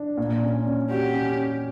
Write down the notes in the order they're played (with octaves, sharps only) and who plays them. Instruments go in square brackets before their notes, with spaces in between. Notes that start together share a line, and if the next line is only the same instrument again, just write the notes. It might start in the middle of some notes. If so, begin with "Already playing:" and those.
Already playing: [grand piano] D4
A#2
C#4
C#4
[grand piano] F#4 [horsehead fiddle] G4
[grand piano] C#4